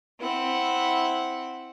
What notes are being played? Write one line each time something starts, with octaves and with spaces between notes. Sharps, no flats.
C4 E4 F#5